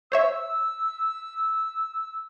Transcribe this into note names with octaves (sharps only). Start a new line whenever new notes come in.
C5 C#5 E5 E6